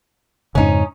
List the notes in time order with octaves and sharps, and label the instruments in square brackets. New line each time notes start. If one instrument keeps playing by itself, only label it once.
[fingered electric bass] F2 G#2 C#3 [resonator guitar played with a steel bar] C#4 D#4